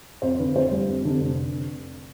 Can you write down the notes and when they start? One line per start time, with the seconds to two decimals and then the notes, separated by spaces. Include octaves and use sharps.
0.22 F2 C5
0.39 D3 B4
0.56 F2 C5
0.71 G3
0.89 F2
1.05 D3
1.21 F1